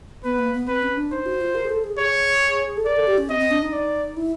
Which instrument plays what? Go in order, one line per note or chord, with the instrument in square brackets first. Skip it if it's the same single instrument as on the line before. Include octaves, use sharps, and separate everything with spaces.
[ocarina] B3 [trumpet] B4
[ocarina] A#3
B3
[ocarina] C4 [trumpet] B4
[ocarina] C#4
D4
[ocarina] D#4 [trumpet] C5
[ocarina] F#4
F4
A#4
G#4
A4
G#4
[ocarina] G#4 [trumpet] C#5
[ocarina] A4
[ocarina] A#4 [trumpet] D5
[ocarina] A4
G4
C#4
[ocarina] C4 [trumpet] D#5
[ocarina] C4
D4
D#4
[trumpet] D5
[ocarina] E4